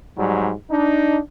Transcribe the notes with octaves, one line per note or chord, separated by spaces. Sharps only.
G#2 F#3 G3
D4 D#4